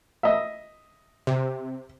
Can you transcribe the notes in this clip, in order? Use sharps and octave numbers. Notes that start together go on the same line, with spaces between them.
D#5 E5
C3